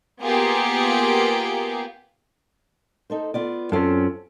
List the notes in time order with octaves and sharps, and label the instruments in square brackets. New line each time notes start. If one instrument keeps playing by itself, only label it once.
[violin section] A#3 B3 F4 G4 G#4
[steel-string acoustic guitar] D#4 A4 C5
B3 F4 D5
[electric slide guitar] F#2 C4 C#4 [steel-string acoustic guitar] F4 A4